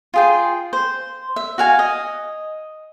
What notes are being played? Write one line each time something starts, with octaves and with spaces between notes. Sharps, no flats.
F4 G#4 G5
C5
E5
F#4 F5 G#5
D#5